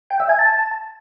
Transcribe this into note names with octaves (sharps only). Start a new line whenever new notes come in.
G5
E5
G#5
A5